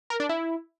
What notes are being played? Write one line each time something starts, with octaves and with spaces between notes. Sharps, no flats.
A#4
D4
E4